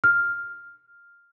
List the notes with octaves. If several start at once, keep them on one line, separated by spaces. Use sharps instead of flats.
F6